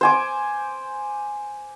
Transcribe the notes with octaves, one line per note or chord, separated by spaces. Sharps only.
C5 G#5 D6